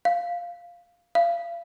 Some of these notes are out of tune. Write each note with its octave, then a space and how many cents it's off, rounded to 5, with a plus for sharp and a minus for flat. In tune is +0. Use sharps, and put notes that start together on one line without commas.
F5 +0
F5 -35